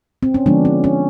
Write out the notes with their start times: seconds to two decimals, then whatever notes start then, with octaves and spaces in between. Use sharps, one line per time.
0.23 C4
0.34 C#4
0.46 D3 F3 G#3 B3 D4
0.65 C#4
0.84 C#4